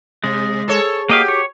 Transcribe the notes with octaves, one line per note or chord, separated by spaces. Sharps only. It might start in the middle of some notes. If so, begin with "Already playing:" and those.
C3 G#3
G#4 A4 C#5
A#3 F#4 G4 D#5 F5
C#5